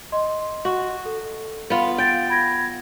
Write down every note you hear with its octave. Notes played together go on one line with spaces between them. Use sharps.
D#5 C6
F#4
A4
B3 F4
F5 G5 A6 D7
B5 G#6 A#6